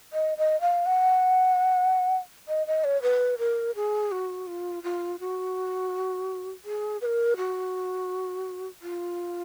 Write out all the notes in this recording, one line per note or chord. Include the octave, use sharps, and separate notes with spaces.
D#5
D#5
F5
F#5
D#5
D#5
C#5
B4
A#4
G#4
F#4
F4
F4
F#4
G#4
B4
A#4
F#4
F4